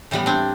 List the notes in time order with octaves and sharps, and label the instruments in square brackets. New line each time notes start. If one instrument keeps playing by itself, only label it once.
[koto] A2 E3 G3 B3
C4 D4